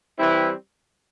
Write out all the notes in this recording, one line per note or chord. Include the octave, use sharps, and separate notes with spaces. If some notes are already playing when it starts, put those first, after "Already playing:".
E3 G3 C4 E4